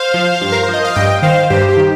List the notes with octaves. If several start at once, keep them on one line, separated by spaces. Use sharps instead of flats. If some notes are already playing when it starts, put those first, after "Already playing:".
Already playing: C5 F5
F3
G2
A#4
C5
F3
D#5
F5
G2 D#5 G5
D#3 C5 F5
G2 G4 C5
G4
D#3